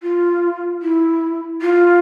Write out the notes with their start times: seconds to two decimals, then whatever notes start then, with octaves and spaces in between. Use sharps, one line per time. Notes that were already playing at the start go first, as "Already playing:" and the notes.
0.03 F4
0.82 E4
1.62 F4